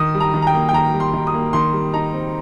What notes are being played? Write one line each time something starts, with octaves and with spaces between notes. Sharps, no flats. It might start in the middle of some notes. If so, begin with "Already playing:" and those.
Already playing: D#3 D#6
G3
A#5
D#3
A#5
G5
A#3
G5
D#3 A#5
G3
C6
D#3
D#6
A#3
D#3 C6
G3
D#4 A#5
C4